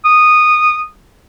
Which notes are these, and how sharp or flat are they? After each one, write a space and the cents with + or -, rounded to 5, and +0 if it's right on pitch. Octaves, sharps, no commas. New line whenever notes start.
D#6 -15